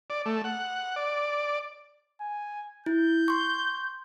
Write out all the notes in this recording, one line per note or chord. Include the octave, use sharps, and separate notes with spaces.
D5
A3
F#5
D5
G#5
E4 G6
C6 C#6